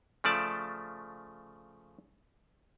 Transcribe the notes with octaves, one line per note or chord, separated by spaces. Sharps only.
C#3 F3 A3 D5 A5